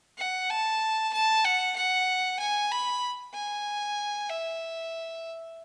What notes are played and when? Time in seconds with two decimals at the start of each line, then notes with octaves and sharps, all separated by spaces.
0.18 F#5
0.50 A5
1.13 A5
1.44 F#5
1.76 F#5
2.39 G#5
2.71 B5
3.34 G#5
4.29 E5